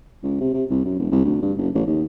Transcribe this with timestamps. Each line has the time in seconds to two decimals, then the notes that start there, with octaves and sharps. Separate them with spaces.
0.24 C#2
0.40 C3
0.54 C3
0.70 C2
0.85 F#2
0.99 E1
1.11 C2
1.25 D2
1.42 G2
1.58 F#1
1.75 A1
1.87 D#2